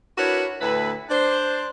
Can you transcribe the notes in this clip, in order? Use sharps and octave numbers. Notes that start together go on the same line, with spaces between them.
D4 E4 F#4 A#4 B4 C#5
D2 A2 E4 B4
D4 C5